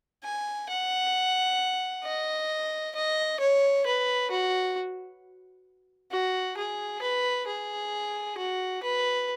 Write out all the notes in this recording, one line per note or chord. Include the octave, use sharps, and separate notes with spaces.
G#5
F#5
D#5
D#5
C#5
B4
F#4
F#4
G#4
B4
G#4
F#4
B4